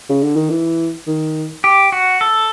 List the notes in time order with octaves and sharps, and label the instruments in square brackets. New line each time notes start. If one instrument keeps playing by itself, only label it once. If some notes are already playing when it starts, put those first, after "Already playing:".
[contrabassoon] C#3
D3
D#3
E3
D#3
[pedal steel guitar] G4
F#4
A4